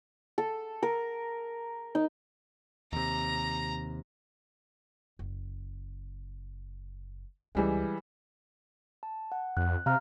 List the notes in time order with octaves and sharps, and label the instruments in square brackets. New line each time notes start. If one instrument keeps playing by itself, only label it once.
[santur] A4
A#4
D#4
[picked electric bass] D#2 C3 [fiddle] A#5
[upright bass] F#1
[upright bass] C#2 D3 [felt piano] E3 G3 G#3
[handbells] A5
F#5
[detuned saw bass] F2 [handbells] F#6
[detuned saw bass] C3 [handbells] F5 A#5 F6